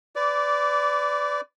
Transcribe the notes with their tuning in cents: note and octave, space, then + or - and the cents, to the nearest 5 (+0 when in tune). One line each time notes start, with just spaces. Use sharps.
B4 +30 D5 -10 D6 -25